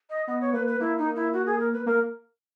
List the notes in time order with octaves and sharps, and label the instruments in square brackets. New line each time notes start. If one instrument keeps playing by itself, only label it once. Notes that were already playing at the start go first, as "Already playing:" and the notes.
[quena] D#5
[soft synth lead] B3 [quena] D#5
[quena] C#5
[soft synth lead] A#3 [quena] B4
[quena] B4
[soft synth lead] A#3 [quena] E4
[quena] D#4
E4
F#4
G#4
A#4
B4
[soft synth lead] A#3 [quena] A#4